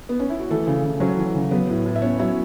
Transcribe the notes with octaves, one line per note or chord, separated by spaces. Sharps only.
B3
C#4
E4
F#4
E3 A3 A4
C#3
C#3
F#3 C#4 F#4
E3
C#3
F#3 B3 B4
A2
A2
E5
B3 C#4 C#5
F#3 E4 E5